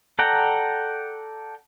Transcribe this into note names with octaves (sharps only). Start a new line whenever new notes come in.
A4 D5 F#5 G5 A#5